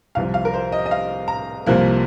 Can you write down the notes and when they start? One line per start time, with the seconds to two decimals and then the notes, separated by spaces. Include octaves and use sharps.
0.15 C2 C3 F3 F5
0.34 F5
0.45 A#4
0.53 C5
0.72 D#5
0.86 D#5
0.91 F5
1.28 A#5
1.66 C2 C3 F3 A#3